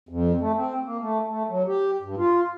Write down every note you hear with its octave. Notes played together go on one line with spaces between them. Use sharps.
F2
A3
C4
A#3
A3
A3
F#3
G4
G2
F4